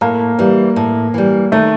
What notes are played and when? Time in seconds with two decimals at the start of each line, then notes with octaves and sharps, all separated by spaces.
0.01 A2 A#3
0.39 E3 G3
0.76 A2
1.14 E3 G3
1.52 D#3 A3